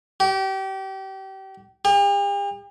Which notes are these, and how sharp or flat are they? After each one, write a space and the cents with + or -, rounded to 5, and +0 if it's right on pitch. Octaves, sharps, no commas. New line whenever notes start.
G4 -30
G4 +45